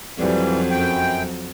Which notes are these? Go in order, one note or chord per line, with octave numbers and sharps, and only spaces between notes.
F2 E3 F#3 G3
F#2 G5